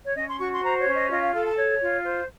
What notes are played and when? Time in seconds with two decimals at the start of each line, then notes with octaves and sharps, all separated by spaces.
0.04 C#5
0.15 C#4 D#5
0.27 C6
0.39 F#4 C#6
0.52 C6
0.62 C5 A#5
0.78 C#5
0.86 C#4
0.94 D#5
1.10 F4 D#5
1.21 F5
1.33 A4 F5
1.45 A5
1.57 C#5
1.80 F4
2.04 C5